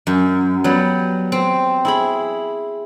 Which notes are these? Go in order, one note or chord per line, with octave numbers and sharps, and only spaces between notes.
F#2
F#3 G3 B3
C4
E4 G#4 B5